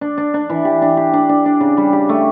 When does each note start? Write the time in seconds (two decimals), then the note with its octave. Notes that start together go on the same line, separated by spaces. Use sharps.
0.01 D4
0.18 D4
0.34 D4
0.50 E3
0.65 G4
0.82 D4
0.97 G4
1.13 D4
1.29 D4
1.45 D4
1.61 C#3
1.77 G3
1.93 G4
2.09 A3